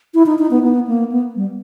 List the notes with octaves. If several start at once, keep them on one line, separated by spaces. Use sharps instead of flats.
E4
D#4
D#4
B3
B3
A#3
B3
G3